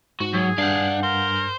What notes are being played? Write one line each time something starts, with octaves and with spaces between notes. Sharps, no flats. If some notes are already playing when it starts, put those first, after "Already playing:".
G#2 F#4
F#3 G#4
G2 D4 F5 F#5 G#5 G6
A#4 C5